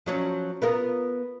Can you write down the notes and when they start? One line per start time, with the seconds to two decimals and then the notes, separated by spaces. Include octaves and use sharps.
0.06 F3 F#3 C#4
0.62 B3 F4 A#4